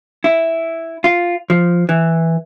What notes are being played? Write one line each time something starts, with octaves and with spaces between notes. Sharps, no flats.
E4
F4
F3
E3